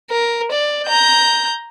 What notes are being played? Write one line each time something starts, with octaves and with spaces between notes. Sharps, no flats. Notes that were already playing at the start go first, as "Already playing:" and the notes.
A#4
D5
A#5 G6